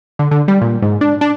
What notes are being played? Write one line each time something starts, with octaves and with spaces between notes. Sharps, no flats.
D3
D3
G3
A#2
G#2
D4
D4